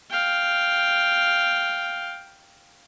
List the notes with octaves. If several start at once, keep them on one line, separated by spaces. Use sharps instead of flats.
F5 G5